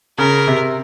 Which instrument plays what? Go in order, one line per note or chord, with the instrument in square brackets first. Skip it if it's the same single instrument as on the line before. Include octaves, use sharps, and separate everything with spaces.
[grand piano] C#3 [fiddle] A#4
[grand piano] C3